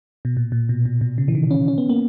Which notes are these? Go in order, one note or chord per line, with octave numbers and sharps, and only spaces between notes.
B2
A#2
A#2
B2
B2
B2
C#3
E3
D#3
C#4
C#4
B3
A#3